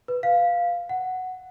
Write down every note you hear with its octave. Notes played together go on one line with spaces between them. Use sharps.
B4
F5
F#5